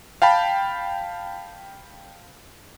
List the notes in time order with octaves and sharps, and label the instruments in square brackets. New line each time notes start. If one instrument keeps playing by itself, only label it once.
[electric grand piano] F5 G5 A5 B5